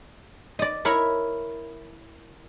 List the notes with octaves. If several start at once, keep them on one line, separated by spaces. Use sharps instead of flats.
D5 D#5
E4 A#4 C#5 B5